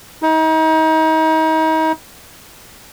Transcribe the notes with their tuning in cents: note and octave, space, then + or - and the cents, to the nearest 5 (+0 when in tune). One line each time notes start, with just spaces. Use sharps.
D#4 +35